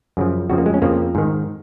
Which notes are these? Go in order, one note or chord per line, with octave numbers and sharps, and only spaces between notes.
F#2 C#3 F3
F2 C#3 F3 F#4
A#3
G#3
C#4
F2 C#3 F3 A#3
G#2 D#3